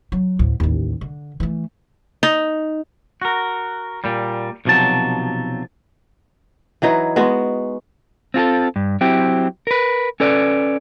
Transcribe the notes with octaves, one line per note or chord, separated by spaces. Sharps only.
F#3
D2 A2
A1 D#2
D3
E3 A3
D#4
F#4 A#4
A#2 G3
B1 C3 F3 F#3 A5
E3 F#3 D#4 B4
G#3 B3 F#4
C4 F4 G#4 A4
G2
F#3 C4 E4 G4
A#4 B4
C#4 A4 B4 D5